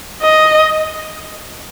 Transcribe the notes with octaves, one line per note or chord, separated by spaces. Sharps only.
D#5